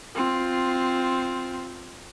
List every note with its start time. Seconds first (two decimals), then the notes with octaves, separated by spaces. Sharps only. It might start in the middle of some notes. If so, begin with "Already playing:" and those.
0.15 C4 F4